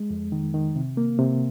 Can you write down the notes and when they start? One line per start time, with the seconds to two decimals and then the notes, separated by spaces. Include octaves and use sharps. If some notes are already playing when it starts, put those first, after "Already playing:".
Already playing: G#3
0.10 F2
0.32 D#3
0.54 D#3
0.76 C3
0.97 A#3
1.19 C3